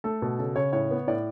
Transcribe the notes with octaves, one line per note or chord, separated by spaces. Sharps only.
A3 A4
B2
C#3 A4
C#3 C#5
A2 C#5
B3
A2 D5